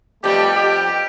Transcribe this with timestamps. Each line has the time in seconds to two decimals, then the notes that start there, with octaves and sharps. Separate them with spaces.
0.24 F2 G3 A3 B3 G4
0.56 G4